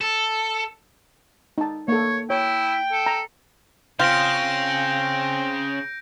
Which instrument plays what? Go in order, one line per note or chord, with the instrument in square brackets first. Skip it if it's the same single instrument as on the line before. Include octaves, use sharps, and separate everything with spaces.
[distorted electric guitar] A4
[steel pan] D#4 A5
[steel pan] A#3 A4 [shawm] C#5
[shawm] E4 [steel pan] C#5 [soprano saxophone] G5
[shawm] A4
[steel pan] A#5
[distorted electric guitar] C#3 [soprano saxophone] C4 [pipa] F4 [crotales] G6 A#6 D7